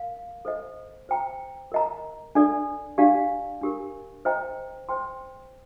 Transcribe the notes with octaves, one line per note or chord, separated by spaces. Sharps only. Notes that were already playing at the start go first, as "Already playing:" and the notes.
Already playing: A#4 F5
A4 C5 D#5
C5 G5 A#5
A#4 D#5 A#5
D4 A4 D5
D4 G4 D5 F5
D4 G4 A#4
C5 D#5 G5 A#5
C5 G5 C6